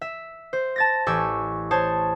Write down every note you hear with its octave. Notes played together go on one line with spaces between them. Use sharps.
E5
C5
A5 A6 A#6
A1 G4 G#5 C#6 E6
C5 C#5 A5 D#6